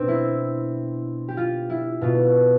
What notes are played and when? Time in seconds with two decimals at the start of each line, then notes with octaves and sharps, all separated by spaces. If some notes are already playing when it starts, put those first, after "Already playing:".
Already playing: B2 C4 D4
0.08 E4
1.28 G4
1.37 F4
1.70 E4
2.01 B2 F4